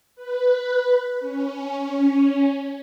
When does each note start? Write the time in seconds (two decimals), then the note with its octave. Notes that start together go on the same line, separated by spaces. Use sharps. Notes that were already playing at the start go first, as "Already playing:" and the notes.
0.15 B4
1.20 C#4